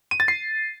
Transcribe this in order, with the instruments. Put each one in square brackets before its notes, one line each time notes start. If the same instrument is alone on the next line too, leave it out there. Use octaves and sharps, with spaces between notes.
[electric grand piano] D#7
A6
C7